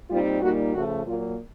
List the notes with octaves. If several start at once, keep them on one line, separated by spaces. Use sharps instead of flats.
A#2 G3 C4 D#4 F4
A#2 G3 A#3 D#4 F#4
C#3 F3 A3 F#4
A#2 F#3 A#3 F4